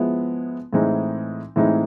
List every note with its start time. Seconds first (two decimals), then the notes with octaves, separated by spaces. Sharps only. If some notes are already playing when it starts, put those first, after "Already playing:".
Already playing: F3 G#3 B3 E4
0.73 A2 E3 G#3 C4 D#4
1.56 A2 E3 G#3 C4 D#4